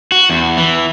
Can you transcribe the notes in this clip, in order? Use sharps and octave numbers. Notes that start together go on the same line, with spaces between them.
F#4
E2
E3